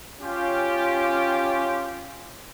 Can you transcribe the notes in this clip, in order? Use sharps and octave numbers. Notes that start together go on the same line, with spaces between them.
C#4 F4 G4